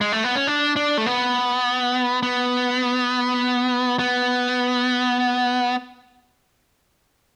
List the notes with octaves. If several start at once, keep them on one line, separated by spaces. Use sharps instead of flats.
G#3
A3
B3
C#4
D4
D4
A3
B3
B3
B3